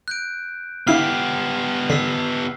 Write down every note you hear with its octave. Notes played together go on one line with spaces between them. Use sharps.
F#6 G6 D7
D3 B3 E4 G4 F5 F6 C7
D3 D#3 E6 B6 C7